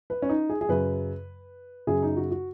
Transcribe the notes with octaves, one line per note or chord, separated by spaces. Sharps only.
B4
C#4
D#4
G#4
G#4
F#2 C#3 B4
F#2 C#3 G#4
D#4
F#4
F#4